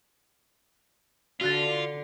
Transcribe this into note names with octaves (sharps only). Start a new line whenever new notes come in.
D3 F4 F#4 F#6 A6